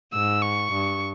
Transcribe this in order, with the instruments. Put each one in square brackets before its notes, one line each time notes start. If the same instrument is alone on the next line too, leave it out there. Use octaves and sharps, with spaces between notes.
[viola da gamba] G#2 [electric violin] E6
[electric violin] C#6
[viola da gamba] G2